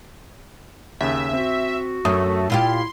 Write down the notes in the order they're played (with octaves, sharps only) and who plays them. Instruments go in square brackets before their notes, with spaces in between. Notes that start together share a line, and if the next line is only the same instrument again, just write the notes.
[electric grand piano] D#2 C#3 [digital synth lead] E5
[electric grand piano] C4 [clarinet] F#4
[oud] F#2 [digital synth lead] A3 [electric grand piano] D#6
[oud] A#2 F4 G4 [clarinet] E4 [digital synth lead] C6